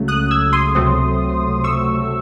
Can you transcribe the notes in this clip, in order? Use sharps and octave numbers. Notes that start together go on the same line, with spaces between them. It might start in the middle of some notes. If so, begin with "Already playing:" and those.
Already playing: C#2 C#3 F#3 A3
D#6 F#6
E6 G#6
C6 D#6
C#2 C3 F#3 A3 C4
C#6 E6